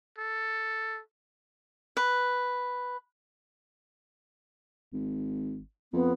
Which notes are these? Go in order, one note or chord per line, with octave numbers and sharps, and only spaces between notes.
A4
B4
G#1
F2 B3